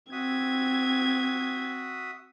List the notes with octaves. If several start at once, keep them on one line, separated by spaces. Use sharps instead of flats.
C4 F#4 E5 D#6 G#6